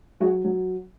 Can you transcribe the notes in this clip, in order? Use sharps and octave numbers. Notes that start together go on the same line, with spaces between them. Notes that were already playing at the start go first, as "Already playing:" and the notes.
F#3 F#4 G#4
F#3